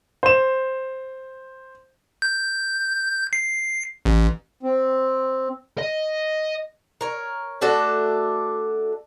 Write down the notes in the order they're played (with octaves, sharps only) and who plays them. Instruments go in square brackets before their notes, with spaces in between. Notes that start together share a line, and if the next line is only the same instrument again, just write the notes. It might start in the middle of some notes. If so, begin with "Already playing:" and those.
[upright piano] C5 E7
[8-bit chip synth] G6
C7
A1
[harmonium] C4
[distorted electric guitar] D#5
[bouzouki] A#4 C#5
A3 D4 F#4 A4